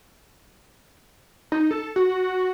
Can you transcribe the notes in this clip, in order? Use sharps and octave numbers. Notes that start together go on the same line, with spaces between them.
D#4
A4
F#4